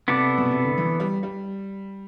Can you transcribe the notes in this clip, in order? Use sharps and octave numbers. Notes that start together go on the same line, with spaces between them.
C3 B3 E4 A4 D5
B2
C3
D3
E3
G3
G3